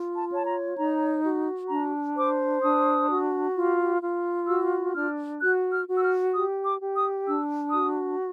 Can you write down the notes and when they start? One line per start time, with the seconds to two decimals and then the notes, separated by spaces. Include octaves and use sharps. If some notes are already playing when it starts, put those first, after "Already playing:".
Already playing: F4
0.15 A5
0.31 C#5
0.36 A5
0.46 A#5
0.77 D#4 A#5
1.23 F#4
1.69 D4 A#5
2.16 C5 D6
2.62 D4 D#6
3.09 F#4
3.56 F4
4.01 F4
4.48 F#4 E6
4.94 D4 F6
5.41 F#4 F#6
5.72 F6
5.87 F#4
5.98 E6
6.02 F6
6.33 G4 D#6
6.65 D6
6.80 G4
6.96 D#6
7.27 D4 E6
7.72 F#4 D#6